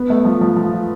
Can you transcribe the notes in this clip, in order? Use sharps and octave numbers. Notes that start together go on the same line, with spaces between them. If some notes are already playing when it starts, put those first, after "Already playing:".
Already playing: B3
A3
F3
F3
F3